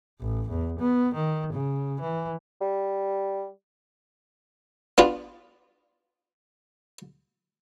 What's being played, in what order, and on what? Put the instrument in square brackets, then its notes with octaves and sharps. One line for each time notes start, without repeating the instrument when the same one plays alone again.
[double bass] A1
E2
B3
D#3
C#3
E3
[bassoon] G3
[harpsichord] B3 D4 F4